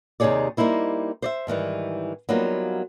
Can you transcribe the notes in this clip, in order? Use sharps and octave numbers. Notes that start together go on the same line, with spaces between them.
D#2 C3 D#4 G#4 C#5 D5
G3 A#3 D#4 E4 C5
C5 D5 E5
G#2 D#3 E3 G3
F#3 G3 A#3 B3 D#4 F4